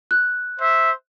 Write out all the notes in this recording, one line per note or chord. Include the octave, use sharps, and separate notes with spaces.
F#6
C5 E5